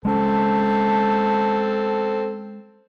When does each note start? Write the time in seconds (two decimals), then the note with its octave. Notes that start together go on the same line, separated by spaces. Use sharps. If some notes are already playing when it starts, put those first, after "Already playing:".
0.05 G#3 C4 C#4 A4 A5